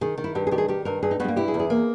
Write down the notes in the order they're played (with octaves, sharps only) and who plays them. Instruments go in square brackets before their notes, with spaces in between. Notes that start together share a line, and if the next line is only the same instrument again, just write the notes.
[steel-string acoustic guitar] D#3 [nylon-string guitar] G#4
[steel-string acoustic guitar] D#3
[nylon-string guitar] E4
[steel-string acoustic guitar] G2 [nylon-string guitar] G4
[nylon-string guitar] G#4
[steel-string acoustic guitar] D#3 [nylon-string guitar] G4
[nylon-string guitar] G#4
[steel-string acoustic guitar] D#3 [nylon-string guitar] G4
[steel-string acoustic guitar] G2 [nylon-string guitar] A#4
[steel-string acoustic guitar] G2 [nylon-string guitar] G#4
[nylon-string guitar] D#4
[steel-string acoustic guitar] G2 [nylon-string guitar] G#3 B3
[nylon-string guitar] A#3
[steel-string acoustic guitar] E4 [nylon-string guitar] G4
[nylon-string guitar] G#4
[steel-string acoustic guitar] E2
[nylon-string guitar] G#4
[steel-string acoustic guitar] A#3